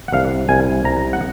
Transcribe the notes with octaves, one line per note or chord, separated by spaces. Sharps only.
F#5
C2 F5
C2 G#5
C2 A#5
F#5